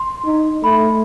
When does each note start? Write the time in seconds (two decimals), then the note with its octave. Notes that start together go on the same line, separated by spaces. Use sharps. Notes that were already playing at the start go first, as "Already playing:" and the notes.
Already playing: C6
0.25 D#4
0.64 A3 B5